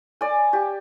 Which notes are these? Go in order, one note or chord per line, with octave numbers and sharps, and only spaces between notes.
D5 G#5
G4